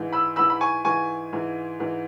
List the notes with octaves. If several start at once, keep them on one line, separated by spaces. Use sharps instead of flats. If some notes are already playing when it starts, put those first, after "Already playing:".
Already playing: G#2 E3
B5 E6
G#2 E3 B5 E6
B5
G#5 C#6
G#2 E3 G#5 C#6
G#2 E3
G#2 E3